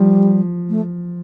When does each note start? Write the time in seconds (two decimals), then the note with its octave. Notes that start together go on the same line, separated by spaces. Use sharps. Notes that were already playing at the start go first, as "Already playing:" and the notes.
Already playing: F3 G3
0.69 A3